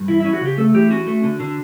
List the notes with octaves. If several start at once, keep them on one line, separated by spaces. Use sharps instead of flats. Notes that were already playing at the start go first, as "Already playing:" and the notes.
Already playing: G2
E3 E4
C#4 E4
F#4
C#3 G4
A3 A4
E3 G4
C#4 F#4
A3
D3
D3